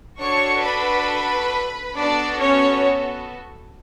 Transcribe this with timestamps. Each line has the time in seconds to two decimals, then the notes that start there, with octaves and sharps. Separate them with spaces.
0.20 D4 F#4 A4 C#5 C#6
0.64 B4 B5
1.96 B3 D4 F#4 A4 D5
2.39 C#4 C#5